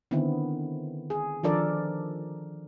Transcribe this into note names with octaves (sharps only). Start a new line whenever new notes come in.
D3 D#3 B3 C4 E4
G#4
D#3 F3 D4 A4 A#4 D5